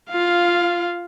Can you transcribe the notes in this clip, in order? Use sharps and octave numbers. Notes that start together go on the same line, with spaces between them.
F4 F5